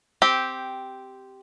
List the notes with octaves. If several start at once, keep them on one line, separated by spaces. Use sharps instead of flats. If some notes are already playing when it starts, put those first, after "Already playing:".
C4 G4